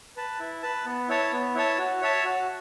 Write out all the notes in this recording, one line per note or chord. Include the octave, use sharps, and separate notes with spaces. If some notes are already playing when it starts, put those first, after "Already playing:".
B4 A5
E4
B4 A5
B3
E4 C#5 A5
B3
E4 C#5 A5
F#4
C#5 E5 A5
F#4